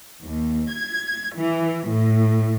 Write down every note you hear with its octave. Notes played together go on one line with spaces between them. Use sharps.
D#2
G#6
E3
A2